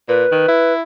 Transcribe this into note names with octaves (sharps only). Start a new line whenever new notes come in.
A#2 B4
D#3
E4